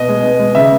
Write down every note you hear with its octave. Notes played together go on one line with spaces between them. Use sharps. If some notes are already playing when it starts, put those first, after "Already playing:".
Already playing: B2 D#5
G#3
B2
G#3
C#3 E5